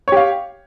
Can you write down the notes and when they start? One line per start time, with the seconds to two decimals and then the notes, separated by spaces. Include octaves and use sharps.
0.08 C#5
0.12 G4
0.17 F5